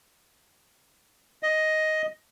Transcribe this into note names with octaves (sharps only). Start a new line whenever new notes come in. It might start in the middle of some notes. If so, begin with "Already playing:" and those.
D#5